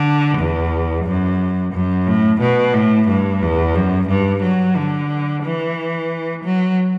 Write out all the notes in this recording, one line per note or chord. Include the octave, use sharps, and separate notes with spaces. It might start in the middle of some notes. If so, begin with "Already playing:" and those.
Already playing: D3
E2
F#2
F#2
A2
B2
A2
G2
E2
F#2
G2
F#3
D3
E3
F#3